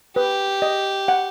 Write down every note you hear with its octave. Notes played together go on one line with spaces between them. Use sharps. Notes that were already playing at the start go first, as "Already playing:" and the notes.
G4 B4
D#5
F#5